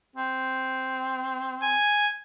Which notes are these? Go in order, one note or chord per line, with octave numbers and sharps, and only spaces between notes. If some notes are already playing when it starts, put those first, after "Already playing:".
C4
G#5